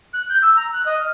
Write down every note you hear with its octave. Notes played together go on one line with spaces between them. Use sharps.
F#6
G6
E6
A#5
F#6
D#5
F6